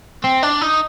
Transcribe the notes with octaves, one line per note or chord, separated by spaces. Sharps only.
C4
D4
D#4